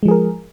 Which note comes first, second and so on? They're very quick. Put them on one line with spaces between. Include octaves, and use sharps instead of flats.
G#3 F3 G#4 A#4